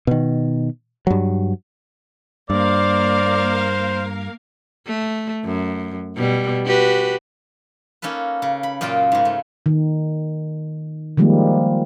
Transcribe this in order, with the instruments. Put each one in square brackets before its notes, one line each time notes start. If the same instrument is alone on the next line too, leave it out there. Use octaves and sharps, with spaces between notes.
[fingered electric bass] B2 D#3
G2 F#3
[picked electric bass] G2 [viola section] A#3 A#4 F5 [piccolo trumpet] C5 [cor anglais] D5
[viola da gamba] A3
F#2
B2 G3
F#4 G4 B4
[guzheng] A#3 C#4 D#4 A4 B4
C#3
B5
F#2 A#2 A#3 F4 G5
G#2 C#3
A3
[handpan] D#3
D#3 F3 G3 G#3 A#3